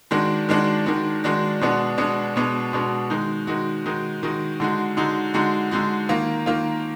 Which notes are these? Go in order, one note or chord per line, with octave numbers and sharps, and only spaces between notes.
D#3 G#3 D4 F#4
D#3 G#3 D4 F#4
D#3 G#3 D4 F#4
D#3 G#3 D4 F#4
B2 G#3 B3 D4 F#4
B2 G#3 B3 D4 F#4
B2 G#3 B3 D4 F#4
B2 G#3 B3 D4 F#4
D#3 G#3 D#4 F#4
D#3 G#3 D#4 F#4
D#3 G#3 D#4 F#4
D#3 G#3 D#4 F#4
D3 G#3 D#4 F#4
D3 G#3 D#4 F#4
D3 G#3 D#4 F#4
D3 G#3 D#4 F#4
D#3 A#3 F4
D#3 A#3 F4